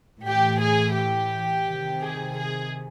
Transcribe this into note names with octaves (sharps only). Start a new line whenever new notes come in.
A2 E3 G4
G#4
G4
C3 D#3
G#4
G#4